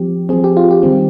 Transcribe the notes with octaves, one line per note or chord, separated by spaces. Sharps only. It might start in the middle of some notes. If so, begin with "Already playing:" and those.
Already playing: F3 C4 G4
F3 C4 G#4
G4
F4
G4
D#3 G3 C4